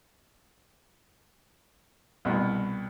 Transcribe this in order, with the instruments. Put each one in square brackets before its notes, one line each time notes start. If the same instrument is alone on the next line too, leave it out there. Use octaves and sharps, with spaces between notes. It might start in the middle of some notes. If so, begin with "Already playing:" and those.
[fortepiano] C2 B2